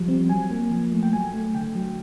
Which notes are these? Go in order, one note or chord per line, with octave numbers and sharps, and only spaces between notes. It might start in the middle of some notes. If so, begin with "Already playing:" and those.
Already playing: F3 G3
C4
F#3 G#5
A#3
F3
A3
G5
F#3 G#5
A3
D3 G5
F#3